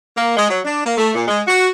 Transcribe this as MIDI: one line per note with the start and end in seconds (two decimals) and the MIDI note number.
0.16 0.32 58
0.37 0.45 56
0.49 0.60 54
0.65 0.81 62
0.85 0.93 58
0.98 1.10 57
1.14 1.27 46
1.28 1.42 56
1.47 1.68 66